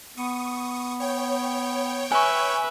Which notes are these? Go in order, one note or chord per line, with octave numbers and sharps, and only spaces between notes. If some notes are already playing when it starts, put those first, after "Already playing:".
B3 C#6 D#6
C#5 G5
B4 E5 G#5 C#6